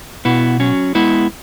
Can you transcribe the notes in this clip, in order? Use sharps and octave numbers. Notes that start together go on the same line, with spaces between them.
B2 B3 E4
F#3 C#4
G#3 B3 E4